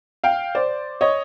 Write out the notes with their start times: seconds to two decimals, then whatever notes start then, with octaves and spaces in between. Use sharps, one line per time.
0.24 F5 G5
0.55 C5 D5
1.01 C#5 D#5